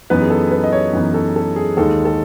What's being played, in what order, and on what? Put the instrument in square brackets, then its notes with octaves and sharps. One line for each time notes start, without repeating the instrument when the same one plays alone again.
[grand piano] F#2 E3 B3 D#4 B4
G#4
A4
B4
D#5
C#5
F#2 E3 B3 D#4
A4
A4
G#4
D#2 D#3 G#3 A4
A4